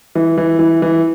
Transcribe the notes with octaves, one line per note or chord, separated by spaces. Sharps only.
E3
E3
E3
E3